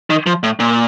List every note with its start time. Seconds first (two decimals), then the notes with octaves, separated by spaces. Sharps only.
0.10 D#3
0.27 F3
0.43 A2
0.60 A#2